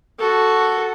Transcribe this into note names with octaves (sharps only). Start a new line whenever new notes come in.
F#4 A4